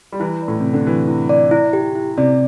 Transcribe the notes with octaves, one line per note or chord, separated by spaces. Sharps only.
G3
E3 E4
D5
A2
C3 E4
D3
E3 G4
E4
D5
E4
G4
E4
C3 D5